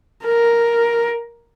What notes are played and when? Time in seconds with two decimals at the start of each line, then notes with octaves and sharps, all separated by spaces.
0.25 A#4